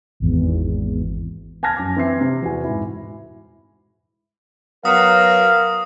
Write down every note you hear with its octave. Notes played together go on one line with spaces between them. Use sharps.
G#1 E2
G#5 A5 F6 G#6 A#6
F#2 D6
E3 C4 E5 C7
C3
E2 F#4 G#5
G#2 E4
F#3 B3 A#4 F5 D#6